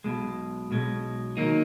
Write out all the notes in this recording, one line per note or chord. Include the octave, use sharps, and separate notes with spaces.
B1 B2 G#3
B1 B2 G#3
D#3 F#3 A#3 D#4